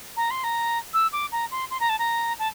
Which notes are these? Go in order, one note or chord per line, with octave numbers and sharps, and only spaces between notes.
A#5
C6
A#5
E6
D6
A#5
C6
C6
A#5
A5
A#5
A5